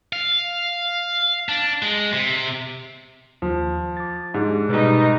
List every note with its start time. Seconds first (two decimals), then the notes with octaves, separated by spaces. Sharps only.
0.13 F5
1.49 D4
1.83 G#3
2.13 C3
3.42 D#2 F3
3.97 D6 A6
4.34 G#2 D4 D#4 G4
4.69 B2 G3 D#4 B4